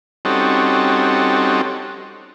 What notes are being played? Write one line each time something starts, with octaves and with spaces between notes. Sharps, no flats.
G3 C4 C#4 D#4 F#4 A4